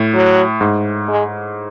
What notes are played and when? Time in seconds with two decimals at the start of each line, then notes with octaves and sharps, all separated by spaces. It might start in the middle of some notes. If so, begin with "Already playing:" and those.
Already playing: A2
0.14 F#3
0.61 G#2
1.08 G#3